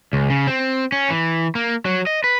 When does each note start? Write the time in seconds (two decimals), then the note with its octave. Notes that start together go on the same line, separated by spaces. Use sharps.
0.13 C#2
0.30 C#3
0.47 C4
0.92 C#4
1.10 E3
1.55 A#3
1.86 F#3
2.07 D#5
2.24 B4